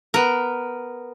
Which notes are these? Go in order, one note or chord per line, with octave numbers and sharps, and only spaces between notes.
B3 A#4